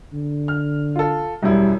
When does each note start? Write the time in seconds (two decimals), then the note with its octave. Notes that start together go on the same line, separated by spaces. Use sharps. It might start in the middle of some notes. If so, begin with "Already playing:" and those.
0.13 D3
0.48 F6
0.96 F4 A4
1.43 E1 F#2 G3 E4